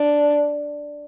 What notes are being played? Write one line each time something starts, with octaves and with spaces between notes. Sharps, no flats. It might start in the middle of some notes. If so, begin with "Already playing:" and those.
Already playing: D4